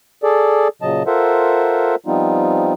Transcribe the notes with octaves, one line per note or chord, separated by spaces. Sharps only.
G#4 A4 D5
A#2 C#3 F#3 D#5 A5
F4 A4 A#4 C5 E5 F#5
F3 G3 B3 C4 D#4 F4